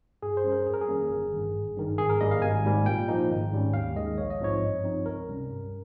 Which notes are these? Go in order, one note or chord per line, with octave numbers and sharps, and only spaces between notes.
G2 G#4
C5
G3 C#4
A#4
F2 G#4
A#4
G#4
D#3 G3 A#3 C#4
G1
G2 D#3
G#1
G2 D#3
G#1 G#4
A#4
G2 G3 A#3 D#5
F5
G#1 G#5
G#2 G3 A#3
A#2 G5
F3 A#3 D#4
G#1
G#2 G3 C#4
D#2 F5
D#3 G#3 D#5
A#1 C#5
D#5
G#2 F3 C4 D#4 C#5
G2
F3 C4 D#4
C#2 A#4
C3 G3 C#4
G2